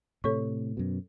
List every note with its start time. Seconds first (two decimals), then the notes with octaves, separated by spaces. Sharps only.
0.24 A2 C3 A4 C#5 C#6
0.77 F#2 B2